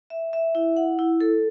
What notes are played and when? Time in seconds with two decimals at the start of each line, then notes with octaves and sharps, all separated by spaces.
0.10 E5
0.33 E5
0.55 E4
0.77 F#5
0.99 E4
1.21 A4